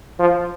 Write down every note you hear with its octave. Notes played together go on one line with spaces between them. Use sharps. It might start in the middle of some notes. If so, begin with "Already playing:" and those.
F3